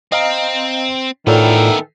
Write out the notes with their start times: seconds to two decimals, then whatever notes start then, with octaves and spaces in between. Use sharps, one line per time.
0.12 C4 D#5 F5 A#5
1.27 A2 D#3 E3 B3 F4 A4 A#4 D5